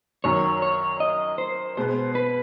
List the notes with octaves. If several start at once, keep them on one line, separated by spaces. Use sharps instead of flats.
F#2 D#3 F#3 C#5
C#5
D#5
C5
B2 G#3 B3 C5
B4